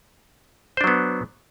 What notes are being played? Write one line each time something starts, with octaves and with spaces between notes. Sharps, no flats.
F#3 B3 D4 C5